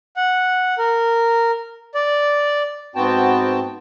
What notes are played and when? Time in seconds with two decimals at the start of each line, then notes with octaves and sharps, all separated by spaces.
0.16 F#5
0.78 A#4
1.94 D5
2.95 G#2 B3 C4 F#4 G5 A5